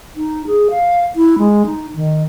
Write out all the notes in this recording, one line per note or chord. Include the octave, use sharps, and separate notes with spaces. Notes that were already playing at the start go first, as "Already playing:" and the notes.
D#4
G#4
F5
E4
G#3
D#4
D#3